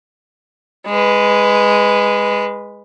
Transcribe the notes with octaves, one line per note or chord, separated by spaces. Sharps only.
G#3 B4